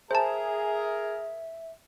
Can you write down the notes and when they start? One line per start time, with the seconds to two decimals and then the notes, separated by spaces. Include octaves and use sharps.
0.11 G#4 A#4 C5 E5 A5 A#5